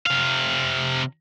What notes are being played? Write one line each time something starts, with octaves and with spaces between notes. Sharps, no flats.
C3 F5